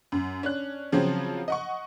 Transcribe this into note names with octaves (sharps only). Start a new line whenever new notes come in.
F#2
C#4 D4 F#6
C#3 F3 F#3 C4 C#4
D#5 F#5 C#6